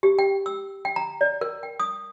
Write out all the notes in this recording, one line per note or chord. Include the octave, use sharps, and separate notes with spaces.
G4
G5
E6
G5
A#5
D5
A#4
G5
D#6